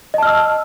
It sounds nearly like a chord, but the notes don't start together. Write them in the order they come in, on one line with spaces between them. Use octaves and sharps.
D#5 A5 F6 E6